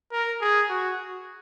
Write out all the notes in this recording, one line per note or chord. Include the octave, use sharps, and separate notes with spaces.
A#4
G#4
F#4